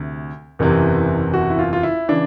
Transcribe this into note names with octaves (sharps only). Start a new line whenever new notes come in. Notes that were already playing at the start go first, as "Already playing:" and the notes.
Already playing: D2 C3
F#1 E2 C3 E3
F#4
E4
F4
F4
E4
C#3 E3 D4